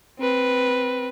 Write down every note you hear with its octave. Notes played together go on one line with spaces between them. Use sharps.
C4 B4